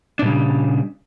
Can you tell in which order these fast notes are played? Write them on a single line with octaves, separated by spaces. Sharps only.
D4 A#2 G3 C#3